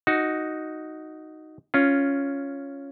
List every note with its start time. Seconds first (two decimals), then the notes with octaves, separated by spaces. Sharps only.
0.07 D#4 F#4
1.74 C#4 F4